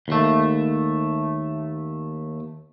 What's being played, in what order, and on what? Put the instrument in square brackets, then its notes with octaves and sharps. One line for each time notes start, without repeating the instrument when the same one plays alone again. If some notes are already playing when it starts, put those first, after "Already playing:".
[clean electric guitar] D#2 A3